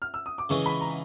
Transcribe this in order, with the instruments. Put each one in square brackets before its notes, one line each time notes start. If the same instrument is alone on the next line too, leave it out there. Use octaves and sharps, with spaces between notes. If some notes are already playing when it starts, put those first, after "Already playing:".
[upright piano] F6
E6
D#6
D6
[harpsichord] C#3 E3 G#3 C#4 [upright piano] C#6
[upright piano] B5
A#5